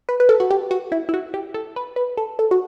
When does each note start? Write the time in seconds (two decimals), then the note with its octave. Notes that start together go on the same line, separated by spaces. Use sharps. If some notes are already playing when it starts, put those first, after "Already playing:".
0.09 B4
0.20 B4
0.29 A4
0.40 F#4
0.51 G4
0.71 F#4
0.92 E4
1.09 E4
1.14 F#4
1.34 G4
1.54 A4
1.76 B4
1.96 B4
2.17 A4
2.39 A4
2.51 F#4